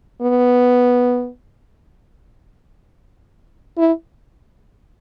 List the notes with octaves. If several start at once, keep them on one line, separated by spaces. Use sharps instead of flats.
B3
E4